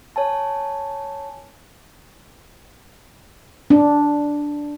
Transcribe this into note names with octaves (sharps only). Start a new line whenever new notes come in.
C#5 G#5 A5
D4